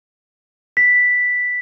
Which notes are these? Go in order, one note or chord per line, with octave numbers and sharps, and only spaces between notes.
B6